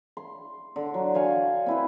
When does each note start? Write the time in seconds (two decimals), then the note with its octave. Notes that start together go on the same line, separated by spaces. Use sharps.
0.17 C6
0.76 D3
0.94 F#3
1.14 C#5 D5 F5 G#5
1.66 C4 E4 B4